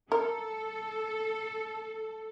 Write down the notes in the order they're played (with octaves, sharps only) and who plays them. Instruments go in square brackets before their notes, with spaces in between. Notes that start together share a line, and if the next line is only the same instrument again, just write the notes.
[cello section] A4 [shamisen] A#4